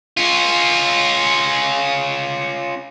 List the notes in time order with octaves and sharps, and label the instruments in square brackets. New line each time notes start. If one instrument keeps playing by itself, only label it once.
[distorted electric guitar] C#4 F4